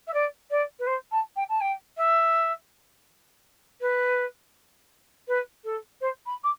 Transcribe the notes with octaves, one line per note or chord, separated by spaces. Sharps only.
E5
D5
D5
B4
C5
A5
G5
A5
G5
E5
B4
B4
A4
C5
B5
D6